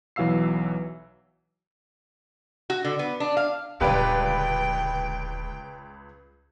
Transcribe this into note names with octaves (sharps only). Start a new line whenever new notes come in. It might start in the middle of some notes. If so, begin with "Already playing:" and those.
B1 E3 F#3 F5 E6 C7
F#4
D3
B3
D4
F5
D#1 C#2 D3 G4 B4 D5 F5 G5